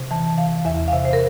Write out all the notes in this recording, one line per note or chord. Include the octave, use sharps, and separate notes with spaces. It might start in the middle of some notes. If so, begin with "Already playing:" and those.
Already playing: C3
E3 A5
E3 F5
E2 E5
F5
C3 E5
C5
A#4